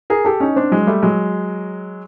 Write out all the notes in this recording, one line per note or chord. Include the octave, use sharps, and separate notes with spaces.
G#4 A#4
G4 A4
C#4 D#4
C4 D4
F#3 G#3
G3 A3
F#3 G#3